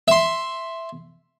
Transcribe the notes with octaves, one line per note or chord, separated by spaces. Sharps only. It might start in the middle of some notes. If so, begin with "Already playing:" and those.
E5 C6